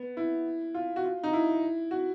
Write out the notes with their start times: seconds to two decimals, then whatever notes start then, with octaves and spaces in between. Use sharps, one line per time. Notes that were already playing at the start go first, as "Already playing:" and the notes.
Already playing: B3
0.17 E4
0.75 F4
0.96 F#4
1.04 F4
1.23 D#4
1.33 E4
1.91 F#4